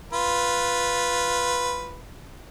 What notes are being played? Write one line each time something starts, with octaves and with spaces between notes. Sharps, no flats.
F4 B4